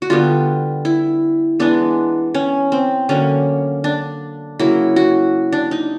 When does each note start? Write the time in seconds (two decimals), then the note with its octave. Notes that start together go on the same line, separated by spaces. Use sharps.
0.02 F#4
0.10 D3 G3 B3 F4
0.85 E4
1.60 E3 G#3 B3 D4
2.35 C#4
2.72 C4
3.09 D3 F#3 A#3 C#4
3.84 D4
4.59 C#3 F#3 A#3 E4
4.96 F#4
5.53 D4
5.71 D#4